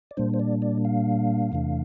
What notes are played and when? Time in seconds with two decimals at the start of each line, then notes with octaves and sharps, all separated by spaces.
0.11 D5
0.17 A#2 G3 A#3 D4 C5
0.34 C5
0.39 D5
0.62 D5
0.85 F5
1.52 E2 C3 E3 A3 D4